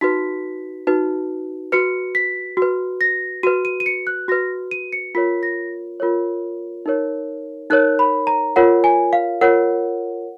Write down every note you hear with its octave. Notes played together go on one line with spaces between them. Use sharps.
D#4 F#4 B4 B6
D#4 F#4 B4
F#4 B4 C#7
B6
F#4 B4
A#6
F#4 B4 D#7
D#7
D#7
C#7
F#6
F#4 B4 A#6
D#7
C#7
F4 A#4 C#5 B6
A#6
F4 A#4 C#5
D#4 A#4 C#5
D#4 A#4 C#5 F#6
B5
A#5
F4 A#4 C#5 F#5
G#5
F5
F4 A#4 C#5 F#5